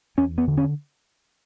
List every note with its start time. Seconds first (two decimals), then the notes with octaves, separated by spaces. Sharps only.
0.18 E2 C#4
0.38 B3
0.47 D3
0.57 C#4